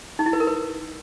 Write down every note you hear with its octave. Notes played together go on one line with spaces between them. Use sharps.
D#4
E4
B4
A#4
B4